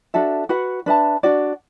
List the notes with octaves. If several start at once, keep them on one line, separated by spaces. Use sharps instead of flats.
D4 F#4 A4 E5
F#4 B4 F#5
D4 B4 E5 A5
D4 F#4 D5